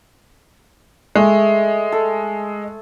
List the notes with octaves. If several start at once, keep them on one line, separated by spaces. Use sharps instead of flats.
G#3 A3
A4